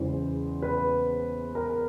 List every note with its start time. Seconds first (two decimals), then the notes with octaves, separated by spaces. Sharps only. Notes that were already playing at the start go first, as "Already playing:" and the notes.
Already playing: E2 C#3 E3 G#3 C5
0.62 B4
1.55 A#4